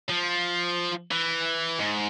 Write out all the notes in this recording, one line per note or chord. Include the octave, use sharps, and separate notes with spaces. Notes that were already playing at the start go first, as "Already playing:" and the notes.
F3
E3
G#2